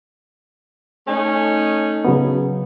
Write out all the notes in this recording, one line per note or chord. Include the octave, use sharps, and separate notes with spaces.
A3 C#4 D#4
C#3 F#3 B3